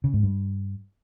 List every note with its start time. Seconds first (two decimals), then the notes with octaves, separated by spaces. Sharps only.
0.04 C#3
0.14 G#2
0.23 G2